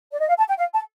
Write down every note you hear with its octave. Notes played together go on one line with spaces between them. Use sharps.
D5
D#5
F5
A5
G5
F5
A5